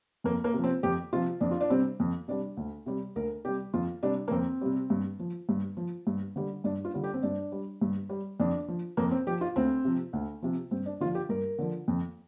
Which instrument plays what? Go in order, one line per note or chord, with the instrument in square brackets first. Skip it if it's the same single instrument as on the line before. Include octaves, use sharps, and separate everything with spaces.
[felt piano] F2 A#3
A#3
C3 F3
C4
F2 G4
C3 F3 F4
F2 D4
F4
D4
C3 G3 C4
F2
C3 G3 D4
D2
C3 G3
D2 A#4
C3 G3 G4
F2 F4
C3 G3 D4
A#3
F2 C4
C3 G3
G2
F3
G2
F3
G2
D3 G3
G2 D4
F4
D3 G3
G4
C4
G2 D4
G3
G2
G3
F2 D4
F3
F2 A#3
C4
F3 G4
F4
D2 C4
C3 F3
D2
C3 F3
G2 C4
D4
D3 F4
F3
G4
G2 A#4
D3 F3
F2